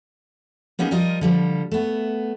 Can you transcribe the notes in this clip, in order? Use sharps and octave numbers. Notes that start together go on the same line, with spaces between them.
A#3 B3 C#4 D#4 G#4
F3 G3 F4 A#4 D#5
D3 F3 G3
A3 B3